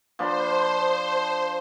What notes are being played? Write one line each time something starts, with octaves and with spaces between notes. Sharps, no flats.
F3 D4 C5 B5